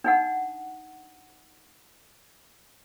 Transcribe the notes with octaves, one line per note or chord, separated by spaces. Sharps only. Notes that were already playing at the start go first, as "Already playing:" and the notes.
D4 D#4 F#5